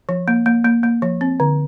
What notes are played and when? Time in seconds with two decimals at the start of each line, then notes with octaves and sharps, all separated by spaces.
0.09 F3
0.28 A#3
0.46 A#3
0.65 A#3
0.83 A#3
1.02 F3
1.21 C4
1.40 D3